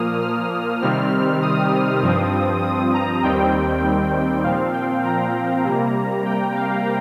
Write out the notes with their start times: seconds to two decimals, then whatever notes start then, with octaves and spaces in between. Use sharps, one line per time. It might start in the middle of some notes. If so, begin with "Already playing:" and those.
Already playing: A#2 F3 A#3 D#6 F6
0.21 F6
0.81 C3 D#3 G3 C4 F6
1.42 D#6
2.02 G2 F3 C4
2.62 D#6
2.94 A#5
3.23 D#2 D#3 G3 C4 G5
4.44 A#2 F3 C4 F5
4.74 G5
5.05 A#5
5.65 C3 G3 A#3
6.25 G5
6.56 F5